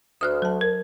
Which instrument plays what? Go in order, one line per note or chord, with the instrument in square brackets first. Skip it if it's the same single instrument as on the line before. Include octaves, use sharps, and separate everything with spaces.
[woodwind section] D2 [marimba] D#6 F6 F#6
[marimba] F#3 A5
A#4